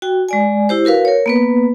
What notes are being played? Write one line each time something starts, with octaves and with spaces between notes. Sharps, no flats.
F#4 G5
G#3 D5 G#5
E4 G4 C5
F#4 A#4 B4 F5
A#4 C#5
A#3 B3 B4